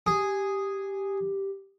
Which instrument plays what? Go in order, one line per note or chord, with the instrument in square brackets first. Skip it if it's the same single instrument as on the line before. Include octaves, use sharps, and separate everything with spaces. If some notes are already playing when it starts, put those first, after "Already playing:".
[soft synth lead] G4 [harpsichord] G#4